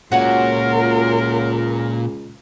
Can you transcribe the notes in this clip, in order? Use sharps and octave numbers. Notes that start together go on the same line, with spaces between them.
C#2 A#2 F4 F#4 A#4 C#5 F#5